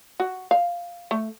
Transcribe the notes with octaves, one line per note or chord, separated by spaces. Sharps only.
F#4
F5
A3